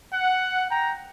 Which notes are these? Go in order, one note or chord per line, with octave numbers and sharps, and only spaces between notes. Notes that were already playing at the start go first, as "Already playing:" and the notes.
F#5
G5 A#5